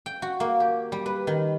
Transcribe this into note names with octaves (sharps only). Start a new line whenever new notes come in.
G5
F#4
A#3
G4
G3
B4
D#3